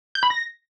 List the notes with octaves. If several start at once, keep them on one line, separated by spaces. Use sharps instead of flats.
G6
B5
A#6